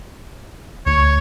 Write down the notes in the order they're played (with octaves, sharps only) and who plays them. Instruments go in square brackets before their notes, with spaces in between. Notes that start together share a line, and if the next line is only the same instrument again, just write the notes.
[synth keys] D2 [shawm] C#5